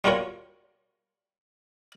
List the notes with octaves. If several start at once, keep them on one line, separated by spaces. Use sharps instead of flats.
G3 F4 F#4 A#4 C#5